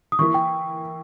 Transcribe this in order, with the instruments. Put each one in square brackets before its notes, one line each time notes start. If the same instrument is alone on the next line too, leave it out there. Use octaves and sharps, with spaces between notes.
[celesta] D#6
[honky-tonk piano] E3 A#3 E4 [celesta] C#6
[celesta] G5